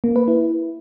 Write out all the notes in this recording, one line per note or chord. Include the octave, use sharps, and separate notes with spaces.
A#3
B4
E4